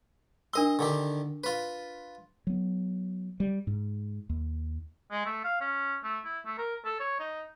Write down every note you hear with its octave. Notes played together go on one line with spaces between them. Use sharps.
D4 A#4 D#5 C6 E6
D3 D#3 G4
F4 B4
F#3 B3
G3
G#2
D#2
G#3
A3
F5
C#4
A3
E4
A3
A#4
A4
C#5
D#4